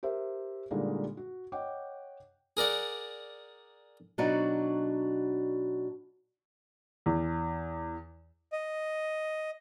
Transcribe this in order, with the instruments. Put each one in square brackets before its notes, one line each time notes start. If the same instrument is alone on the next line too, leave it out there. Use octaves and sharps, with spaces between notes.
[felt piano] G4 A#4 C5 E5
A#2 D3 G3 G#3 A#3 D#4
F#4
C#5 D#5 F#5 G5 D6
[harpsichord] G#4 A#4 D5 F#5
[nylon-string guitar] B2 F#3 D4 D#4 F#4
[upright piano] E2
[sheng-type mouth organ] D#5